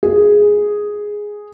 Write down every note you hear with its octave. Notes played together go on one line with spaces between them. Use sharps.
G#4